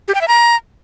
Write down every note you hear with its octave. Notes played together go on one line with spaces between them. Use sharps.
G4
G5
E5
A#5